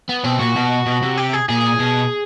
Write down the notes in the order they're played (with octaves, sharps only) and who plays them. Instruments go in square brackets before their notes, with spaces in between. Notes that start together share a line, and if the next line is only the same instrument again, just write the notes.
[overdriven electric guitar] B3
[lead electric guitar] B2 [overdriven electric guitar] C4
[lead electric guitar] A#2 [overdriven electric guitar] F#4
[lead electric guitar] B2
B2
C3
[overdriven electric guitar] G4
G#4
[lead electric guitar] A#2 [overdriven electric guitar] G#4
[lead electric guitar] B2